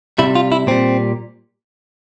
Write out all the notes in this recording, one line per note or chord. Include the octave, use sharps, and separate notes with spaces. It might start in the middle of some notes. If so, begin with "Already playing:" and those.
C3 G3 E4
F4
E4
A#2 G3 C4